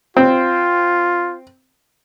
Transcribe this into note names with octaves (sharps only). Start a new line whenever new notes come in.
C4 F4